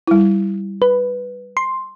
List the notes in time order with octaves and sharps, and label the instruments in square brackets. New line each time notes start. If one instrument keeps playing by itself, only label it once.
[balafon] G3 E4
[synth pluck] B4
C6